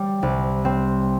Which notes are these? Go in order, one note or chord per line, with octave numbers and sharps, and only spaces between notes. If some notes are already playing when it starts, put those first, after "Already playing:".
Already playing: G3
C2
C4